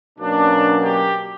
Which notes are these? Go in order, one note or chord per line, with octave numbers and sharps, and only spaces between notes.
B2 F#3 A#3 C#4 D4
G4